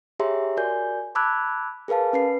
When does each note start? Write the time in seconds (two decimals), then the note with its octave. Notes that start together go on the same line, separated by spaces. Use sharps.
0.20 G4 G#4 C#5 E5 A#5 C6
0.57 F#4 A#4 D5 G#5 G6
1.15 A5 B5 D6 E6 F#6 G#6
1.88 G#4 A#4 B4 F5 A5
2.13 C#4 B4 C7